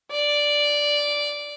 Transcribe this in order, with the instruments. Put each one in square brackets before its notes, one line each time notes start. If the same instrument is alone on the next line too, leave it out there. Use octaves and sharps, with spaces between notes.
[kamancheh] D5